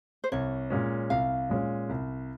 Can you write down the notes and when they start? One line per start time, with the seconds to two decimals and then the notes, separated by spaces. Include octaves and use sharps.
0.24 C5
0.32 C2 C#5
0.70 A#2 G#3 C#4
1.10 C2 F5
1.49 A#2 G#3 C#4
1.89 C2